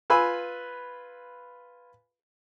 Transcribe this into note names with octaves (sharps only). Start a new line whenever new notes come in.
F4 B4 G#5 B5 E6